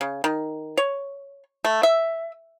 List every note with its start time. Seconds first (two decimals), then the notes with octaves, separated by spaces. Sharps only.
0.01 C#3
0.24 D#3
0.77 C#5
1.65 A3
1.83 E5